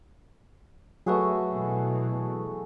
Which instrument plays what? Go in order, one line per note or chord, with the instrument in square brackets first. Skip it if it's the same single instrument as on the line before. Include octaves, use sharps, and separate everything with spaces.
[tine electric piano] F#3 B4 [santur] A3 F#4 G#4
[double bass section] B2 E3